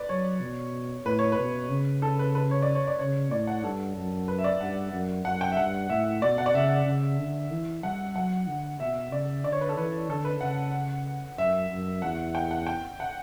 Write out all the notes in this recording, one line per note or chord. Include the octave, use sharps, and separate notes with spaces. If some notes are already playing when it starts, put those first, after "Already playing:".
Already playing: B4 D5
F#3 C#5
B2
A2 B4
C#5
B4
B2
C#3
A4
B4
B4
C#5
D5
C#5
D5
C#3 C#5
A2 D5
F#5
G2 A4
F#2
B4
E5
D5
G2 F#5
F#2
F#2 F#5
G5
E5
G2 F#5
A2 E5
B2 D5
F#5
D5
C#3 E5
C#3
D3
E3
G3 F#5
F#3 F#5
D3
B2 E5
C#3 D5
D3 D5
C#5
B4
A4
E3 B4
D3 A4
B4
C#3 F#5
F#2 E5
F#2
E2 F#5
G5
F#5
G5
F#5